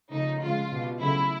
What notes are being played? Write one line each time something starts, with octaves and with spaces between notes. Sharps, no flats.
C#3 F3 A3 D#4
C#3 F3 G#3 F4
B2 G3
C#3 F#3 A3 E4